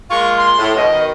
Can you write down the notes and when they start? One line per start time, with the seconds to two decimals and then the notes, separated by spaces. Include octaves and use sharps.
0.10 G#3 A#3 F4 C#6
0.37 C6
0.58 A2
0.76 G2 B2 D#5
0.92 B2 D#3